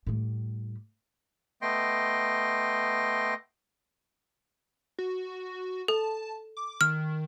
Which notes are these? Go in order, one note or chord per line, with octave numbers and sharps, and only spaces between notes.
A2 G3
A3 B3 D#5 G5 C6
F#4
A4 A5
D6
D#3 F6